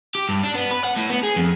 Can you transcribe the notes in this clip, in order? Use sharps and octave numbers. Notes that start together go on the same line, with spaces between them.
G4
G2
D4
B3
B4
F#5
A2
B3
G#4
F2